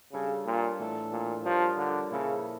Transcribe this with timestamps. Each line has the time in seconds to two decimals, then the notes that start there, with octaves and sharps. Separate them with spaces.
0.13 C#3 G3 D4 A4 C#5
0.46 A#2
0.80 A2 E3 A3 D4 A4
1.12 A#2
1.45 F3 G3 D4 F4 A#4 C#5
1.77 D3
2.11 A#2 C#3 F3 A#3 E4 A4